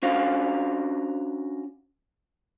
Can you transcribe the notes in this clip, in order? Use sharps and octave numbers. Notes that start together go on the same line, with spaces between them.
C#4 D4 F#4 C5 F5